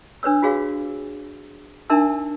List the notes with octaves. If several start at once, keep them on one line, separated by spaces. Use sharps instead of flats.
D4 B4 C#5 E6
F4 F#4 G#4 C#5 F5
D4 D#4 A#4 E5 A5 E6